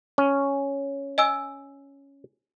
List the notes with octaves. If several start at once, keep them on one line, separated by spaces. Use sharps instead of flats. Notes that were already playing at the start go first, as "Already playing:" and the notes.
C#4
D#5 G#5 E6